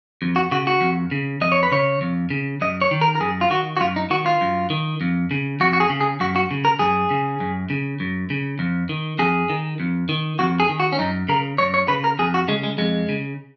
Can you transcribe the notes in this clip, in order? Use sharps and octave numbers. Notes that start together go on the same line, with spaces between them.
F2
F#4
C#3 F#4
F#4
F2
C#3
F2 D#5
C#5
B4
C#3 C#5
F2
C#3
F#2 D#5
C#5
D#3
A#4
A#4
F#2 G#4
F4
D#3 F#4
F#4
F#2 F4
D#4
D#3 F#4
F4
F#2
D#3
F2
C#3
F2 F#4
F#4
G#4
C#3
G#4
F#2 F#4
F#4
C#3
A#4
F#2 G#4
C#3
F#2
C#3
F#2
C#3
F2
D#3
F2 G#4
D#3
F2
D#3
F2 F#4
G#4
D#3
F#4
C#4
F#2 D#4
C#3 A#4
F#2 C#5
C#5
C#3 B4
A#4
F2 G#4
F#4
C#3 G#3
G#3
F2 G#3
C#3